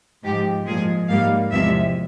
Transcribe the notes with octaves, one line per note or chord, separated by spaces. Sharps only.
G#2 F3 G#3 G4
A#2 F3 G#3 G#4
G#2 G3 A#3 F5
E2 C3 F3 G#3 E5